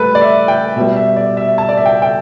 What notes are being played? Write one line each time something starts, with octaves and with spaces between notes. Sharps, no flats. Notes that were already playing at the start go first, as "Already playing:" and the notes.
Already playing: A2 G3 A4 B4
D5
E5
G5
B2 G3 E5
E5
D5
E5
A5
D5
E5
G5
G5